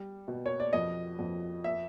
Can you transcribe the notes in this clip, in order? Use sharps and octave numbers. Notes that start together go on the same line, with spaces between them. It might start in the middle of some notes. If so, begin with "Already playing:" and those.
Already playing: G3
B2
C#5
D5
F2 D#5
F2
E5